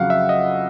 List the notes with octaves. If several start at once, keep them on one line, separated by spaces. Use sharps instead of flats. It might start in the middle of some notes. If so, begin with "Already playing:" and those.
Already playing: F2 C#3 F#3 F5 F#5
E5
D#5